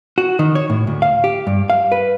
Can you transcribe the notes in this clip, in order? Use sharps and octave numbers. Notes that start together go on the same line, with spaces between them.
F#4
D#3
C#5
A2
D2
F5
G4
G2
F5
B4